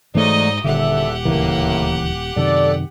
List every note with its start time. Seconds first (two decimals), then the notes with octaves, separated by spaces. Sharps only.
0.15 G#2 E3 F#3 A3 D#4 D5 D#5
0.64 D#1 E2 D3 G4 A4 E5 F#5
1.25 D2 A2 C#3 E3 A#3
2.36 F#2 C3 D#3 A4 D5